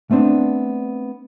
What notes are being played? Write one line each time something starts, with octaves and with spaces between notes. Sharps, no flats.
A3 B3 C4 D4